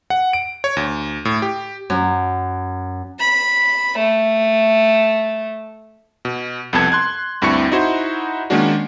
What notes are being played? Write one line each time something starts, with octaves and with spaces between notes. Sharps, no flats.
F#5
D7
C#5
D2
A2
G4
F#2
B5
A3
B2
C2 F2 B3 A4 A5 G#6
C6 F#6 G#6
D2 G2 C4 E4 C#6 C#7
D#4 E4 F#4 C5
D#3 G#3 A#3 C#4 D4 F#4